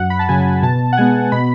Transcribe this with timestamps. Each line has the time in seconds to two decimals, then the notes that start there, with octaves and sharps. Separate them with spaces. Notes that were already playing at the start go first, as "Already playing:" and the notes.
Already playing: F#2 F#5
0.10 B5
0.19 A5
0.29 C#3 F#3 G#5
0.63 B2 A5
0.93 F#5
0.97 G#3 B3 G#5
1.32 B2 B5